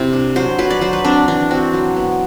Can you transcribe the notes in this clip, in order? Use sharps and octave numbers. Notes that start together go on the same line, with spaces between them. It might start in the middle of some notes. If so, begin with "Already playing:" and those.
Already playing: C3 C4 E4
D4
F#3 C5
F#3 B4
D5
F#3 C5
B4
C4 D4
E3 D4
C4 F#4
F#3
B3